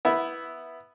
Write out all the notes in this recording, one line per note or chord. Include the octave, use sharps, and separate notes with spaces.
B3 E4